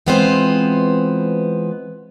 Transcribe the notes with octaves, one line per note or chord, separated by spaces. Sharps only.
E3 G#3 B3 C4 F4 C5